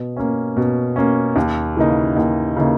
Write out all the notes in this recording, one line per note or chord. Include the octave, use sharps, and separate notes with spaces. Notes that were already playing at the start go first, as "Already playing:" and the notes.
Already playing: B2
A#3 C#4
B2
A#3 C#4
D#2
C#3 E3 A#3 D#4
D#2
C#3 E3 A#3 D#4